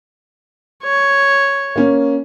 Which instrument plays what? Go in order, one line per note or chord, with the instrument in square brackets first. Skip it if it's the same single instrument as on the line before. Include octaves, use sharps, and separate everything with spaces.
[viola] C#5
[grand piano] A#3 C#4